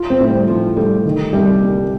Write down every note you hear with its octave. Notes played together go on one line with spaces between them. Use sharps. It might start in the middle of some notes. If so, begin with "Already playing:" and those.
Already playing: F4
C4
A2
G3
F3 F4
G3 A3
D#3
C2 G3
A#3